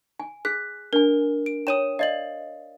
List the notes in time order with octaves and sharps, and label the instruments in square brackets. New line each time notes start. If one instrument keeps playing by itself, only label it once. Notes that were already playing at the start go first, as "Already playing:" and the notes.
[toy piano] G#5
[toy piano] G#4 [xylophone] F#6 B6
[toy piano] D4 G#5 [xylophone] A#4
[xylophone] D7
[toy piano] C#5 G5 [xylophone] D#6 D#7 E7
[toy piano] D5 D#5 [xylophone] F5 A6 F#7